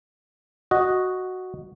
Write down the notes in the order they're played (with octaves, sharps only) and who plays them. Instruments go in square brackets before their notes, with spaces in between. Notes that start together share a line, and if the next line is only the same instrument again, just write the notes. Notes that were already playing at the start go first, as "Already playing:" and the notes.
[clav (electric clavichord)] F#4 D#5